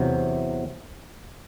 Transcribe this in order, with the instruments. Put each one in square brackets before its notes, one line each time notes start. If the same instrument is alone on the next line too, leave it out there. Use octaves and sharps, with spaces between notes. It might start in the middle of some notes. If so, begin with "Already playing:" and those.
Already playing: [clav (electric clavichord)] E2 C3 F#3